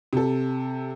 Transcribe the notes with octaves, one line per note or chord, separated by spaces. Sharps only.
C3 A4